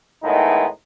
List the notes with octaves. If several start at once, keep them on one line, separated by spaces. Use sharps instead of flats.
A2 D#3 G#3 B3 D#4 E4